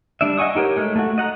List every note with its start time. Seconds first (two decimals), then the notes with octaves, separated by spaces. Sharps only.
0.21 G3 D4 D5 E5
0.38 D#5 F#5 G#5 C#6 D#6
0.55 D#4 G4 A#4 C#5
0.76 G#3 A3
0.96 A3 F#4
1.18 D#5 F#5 A#5